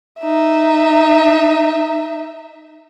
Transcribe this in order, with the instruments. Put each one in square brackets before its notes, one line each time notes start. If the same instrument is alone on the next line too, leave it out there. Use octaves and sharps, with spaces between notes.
[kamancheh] D#4 E5